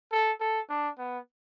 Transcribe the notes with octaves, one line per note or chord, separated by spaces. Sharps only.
A4
A4
D4
B3